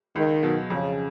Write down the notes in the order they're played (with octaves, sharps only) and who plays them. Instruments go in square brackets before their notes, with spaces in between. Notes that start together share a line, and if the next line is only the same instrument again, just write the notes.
[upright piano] C#2 [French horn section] D#3
[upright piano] B2 F#3
[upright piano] F2 [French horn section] C#3